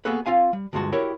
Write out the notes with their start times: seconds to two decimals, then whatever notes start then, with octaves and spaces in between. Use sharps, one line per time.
0.05 A#3 B3 F#4 G#4 A4 B4
0.26 C4 F4 F5 G#5
0.53 G3
0.73 D2 G2 G#3 F4 F#4 A5
0.92 E4 F#4 G4 A#4 C#5